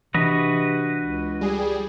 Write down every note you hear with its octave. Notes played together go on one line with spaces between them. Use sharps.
C3 E3 D4 F#4 B4 D#5
C#2
G3 G#4